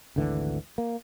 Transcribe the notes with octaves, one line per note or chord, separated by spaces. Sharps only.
G#1 D2 D3 E3
A#3